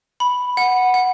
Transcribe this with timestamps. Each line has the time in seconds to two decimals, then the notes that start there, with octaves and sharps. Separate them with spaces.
0.20 B5
0.57 F#5
0.94 F#5